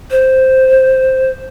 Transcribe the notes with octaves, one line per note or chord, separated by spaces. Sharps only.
C5